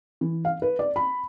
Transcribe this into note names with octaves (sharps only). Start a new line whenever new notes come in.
E3
F5
B4
D5
B5